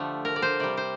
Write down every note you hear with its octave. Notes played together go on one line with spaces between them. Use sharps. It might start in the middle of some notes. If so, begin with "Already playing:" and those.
Already playing: D3 F3 A3 G4
A#4
D5
C5
C3 G3 D5
C5